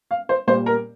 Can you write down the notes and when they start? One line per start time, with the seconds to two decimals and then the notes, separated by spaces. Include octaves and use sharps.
0.11 F5
0.29 C5
0.47 A#2 C5
0.50 G3
0.66 A#4